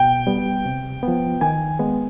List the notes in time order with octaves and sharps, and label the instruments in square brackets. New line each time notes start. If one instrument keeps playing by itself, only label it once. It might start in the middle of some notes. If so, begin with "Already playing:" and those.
Already playing: [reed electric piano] B2 [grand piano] G5
[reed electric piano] G3 B3
C3
F3 B3
[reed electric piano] D#3 [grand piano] G#5
[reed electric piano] G#3 B3